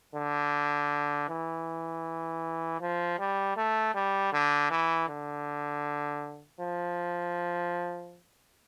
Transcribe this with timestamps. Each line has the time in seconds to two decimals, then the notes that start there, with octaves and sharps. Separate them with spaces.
0.15 D3
1.29 E3
2.81 F3
3.19 G3
3.57 A3
3.95 G3
4.33 D3
4.71 E3
5.08 D3
6.60 F3